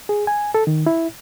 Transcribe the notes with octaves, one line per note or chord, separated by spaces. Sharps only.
G#4
G#5
A4
D#3
E4